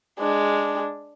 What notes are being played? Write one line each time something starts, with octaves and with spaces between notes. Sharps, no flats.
G#3 D4